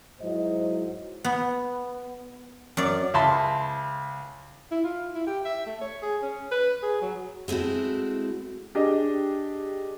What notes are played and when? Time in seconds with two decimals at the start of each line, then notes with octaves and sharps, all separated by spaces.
0.21 G#2 F#3 E4 C5 D#5
1.24 B3
2.77 F#2 D5
3.14 C#2 E5 A5 B5 C6
4.71 E4
4.84 F4
5.15 E4
5.27 G4
5.45 E5
5.66 A3
5.81 C#5
6.02 G#4
6.22 C#4
6.52 B4
6.83 G#4
7.01 F#3
7.48 G#3 A3 C4 E4 F#4
8.75 D4 G4 G#4 D#5